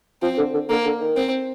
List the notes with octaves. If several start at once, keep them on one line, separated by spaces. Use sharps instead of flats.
F3 C4
D3
D3
D3 A#3
D3
D#3
C4